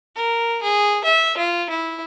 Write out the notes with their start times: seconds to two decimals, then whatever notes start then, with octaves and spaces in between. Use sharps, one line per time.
0.16 A#4
0.63 G#4
1.05 E5
1.37 F4
1.70 E4